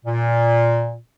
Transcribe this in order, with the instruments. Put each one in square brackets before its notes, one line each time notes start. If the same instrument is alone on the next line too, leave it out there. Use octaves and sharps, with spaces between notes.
[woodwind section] A#2